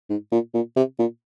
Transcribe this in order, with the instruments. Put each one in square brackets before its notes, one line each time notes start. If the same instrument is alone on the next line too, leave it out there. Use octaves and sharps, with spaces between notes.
[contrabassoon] G#2
A#2
A#2
C3
A#2